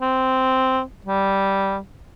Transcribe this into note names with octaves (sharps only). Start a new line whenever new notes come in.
C4
G3